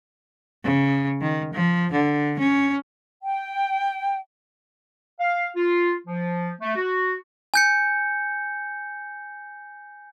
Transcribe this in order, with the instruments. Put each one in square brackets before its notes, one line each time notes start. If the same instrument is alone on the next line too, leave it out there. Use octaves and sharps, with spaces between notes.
[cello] C#3
D#3
F3
D3
C#4
[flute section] G5
[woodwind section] F5
F4
F3
A3
F#4
[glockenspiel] G#5 G6 C#7